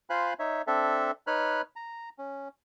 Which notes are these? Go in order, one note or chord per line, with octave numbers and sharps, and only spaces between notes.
F4 C5 F5 G#5 B5 F#6
D#4 C#5 E5
C4 D4 A4 E5
D#4 B4 C#5 B5 F6 F#6
A#5
C#4